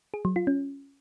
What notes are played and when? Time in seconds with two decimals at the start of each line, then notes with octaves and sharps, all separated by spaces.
0.14 G#4
0.25 F#3
0.36 F4
0.47 C#4